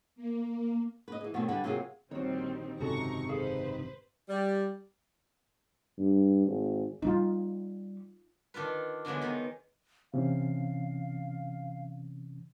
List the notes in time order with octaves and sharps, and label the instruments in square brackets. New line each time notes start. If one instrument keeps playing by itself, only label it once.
[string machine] A#3
[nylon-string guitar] B4 D#5
E3 G#4
B2 D#3 F#3 A3 C4
D3 G3 E4 B4
C3 F#3 A#3 F4 F#4 G#4
[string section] A#1 G3 C4 [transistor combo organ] D#3 [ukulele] F#4 C#5
[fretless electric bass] F#1 G#2 C3 [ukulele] C#4 F#4 A4 [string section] A#5 C#6
[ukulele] G#4 A4 F5 [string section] B4 C5
[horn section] G3
[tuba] G2
G#1
[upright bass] G3 [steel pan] D#4 F4
[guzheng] D#3 D4 F4 B4
D3 E3 F#3 G#3 B3
D#3 B3 D#4
[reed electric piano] C3 E3 C#4 [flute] F5